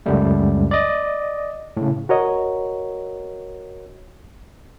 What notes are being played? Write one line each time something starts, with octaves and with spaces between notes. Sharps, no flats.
C#2 F#2 G3 A3
D5 D#5
A2 C#3
F#4 A#4 C#5 D#5